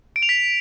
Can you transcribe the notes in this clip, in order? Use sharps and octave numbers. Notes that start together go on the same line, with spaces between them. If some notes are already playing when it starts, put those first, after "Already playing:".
D7
F7
B6